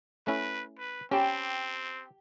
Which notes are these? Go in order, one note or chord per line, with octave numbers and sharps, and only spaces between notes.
A3 C#4 E4 B4
B4
C4 C#4 G4 G5 A5 B5